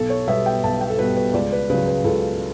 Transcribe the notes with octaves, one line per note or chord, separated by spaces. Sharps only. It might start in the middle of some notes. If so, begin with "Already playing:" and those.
Already playing: B1 A4
C#5
B2 G3 B3 E5
G5
B1 A5
G5
A4
B2 G3 B3 B4
B4
C#2 D5
B4
C#3 F#3 B4
B4
C#2 A4